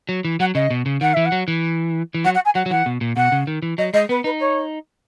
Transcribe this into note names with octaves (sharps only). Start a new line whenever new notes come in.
F#3
E3
F#3 F#5
C#3 D#5
B2
C#3
D#3 F#5
E3 E5
F#5
F#3
E3
E3
F#3 F#5
F#5
G#5
F#3 F#5
F#3
E3 F#5
B2
A#2
B2 F#5
C#3
D#3
E3
F#3 D#5
G#3 D#5
B3 B4
D#4 B4
C#5